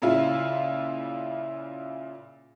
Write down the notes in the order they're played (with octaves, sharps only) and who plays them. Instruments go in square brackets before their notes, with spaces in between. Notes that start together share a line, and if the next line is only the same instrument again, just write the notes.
[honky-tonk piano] A#2 C#3 E4 F4